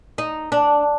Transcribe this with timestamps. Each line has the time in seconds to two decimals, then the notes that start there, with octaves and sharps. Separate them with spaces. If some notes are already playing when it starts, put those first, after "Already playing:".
0.18 D#4
0.52 D4